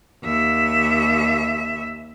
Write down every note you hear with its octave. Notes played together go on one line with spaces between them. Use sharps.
D#2 E5